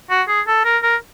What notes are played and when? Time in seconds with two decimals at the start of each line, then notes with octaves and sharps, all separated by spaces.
0.10 F#4
0.28 G#4
0.47 A4
0.65 A#4
0.83 A#4